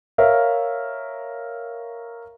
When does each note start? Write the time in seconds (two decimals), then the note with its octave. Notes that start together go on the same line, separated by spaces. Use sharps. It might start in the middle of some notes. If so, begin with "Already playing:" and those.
0.18 A#4 C#5 E5 F5